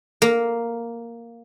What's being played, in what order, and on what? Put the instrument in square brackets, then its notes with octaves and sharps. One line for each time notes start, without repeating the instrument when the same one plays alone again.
[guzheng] A#3